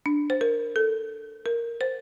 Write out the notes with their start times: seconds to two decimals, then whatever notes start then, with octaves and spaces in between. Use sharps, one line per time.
0.06 D4
0.30 C5
0.41 A#4
0.76 A4
1.46 A#4
1.81 C5